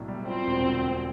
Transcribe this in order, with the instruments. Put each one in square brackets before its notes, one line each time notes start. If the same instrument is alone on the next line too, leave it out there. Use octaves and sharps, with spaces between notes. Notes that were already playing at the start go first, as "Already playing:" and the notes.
Already playing: [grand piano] B1 A2 D4
G3
[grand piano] F3 [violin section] C4
[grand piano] E1
D2
D3